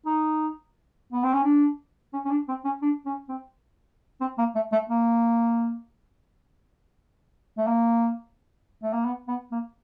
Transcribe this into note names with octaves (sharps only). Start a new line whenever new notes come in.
D#4
B3
C4
C#4
D4
C#4
C#4
D4
C4
C#4
D4
C#4
C4
C4
A#3
A3
A3
A#3
A3
A#3
A3
A#3
B3
B3
A#3